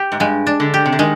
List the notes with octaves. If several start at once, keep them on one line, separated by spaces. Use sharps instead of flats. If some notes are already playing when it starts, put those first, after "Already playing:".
Already playing: G4
G#2
G2 G#3
D4
D3
G4
C3
D3
D#3 G#3